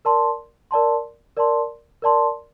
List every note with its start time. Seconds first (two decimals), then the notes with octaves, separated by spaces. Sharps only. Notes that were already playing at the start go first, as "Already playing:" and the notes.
0.05 A#4 D5 A5 C6
0.71 A#4 D5 A5 C6
1.37 A#4 D5 A5 C6
2.02 A#4 D5 A5 C6